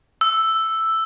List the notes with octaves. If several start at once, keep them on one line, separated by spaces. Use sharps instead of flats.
E6